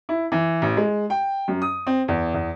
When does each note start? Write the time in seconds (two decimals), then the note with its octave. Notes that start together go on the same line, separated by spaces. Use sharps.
0.09 E4
0.32 E3
0.62 A1
0.77 G#3
1.10 G5
1.48 F#2
1.62 D#6
1.87 C4
2.08 E2
2.34 E2